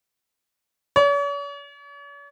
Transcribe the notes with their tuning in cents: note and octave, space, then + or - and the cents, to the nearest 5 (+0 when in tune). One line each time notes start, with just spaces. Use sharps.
C#5 +45